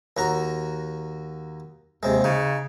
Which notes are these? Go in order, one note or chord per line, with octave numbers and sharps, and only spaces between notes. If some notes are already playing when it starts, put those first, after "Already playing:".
D#2 F#4 A#5
D#2 C3 G#3
C#3 D#4